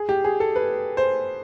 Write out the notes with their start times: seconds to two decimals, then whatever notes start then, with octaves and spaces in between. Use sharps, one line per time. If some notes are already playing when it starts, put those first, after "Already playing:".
Already playing: G#4
0.09 G4
0.24 G#4
0.40 A4
0.56 B4
0.97 C5